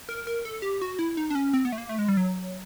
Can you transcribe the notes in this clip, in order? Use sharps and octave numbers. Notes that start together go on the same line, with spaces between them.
A#4
A#4
A4
G4
F#4
E4
D#4
D4
C#4
C4
B3
A3
A#3
A3
G#3
G3
F#3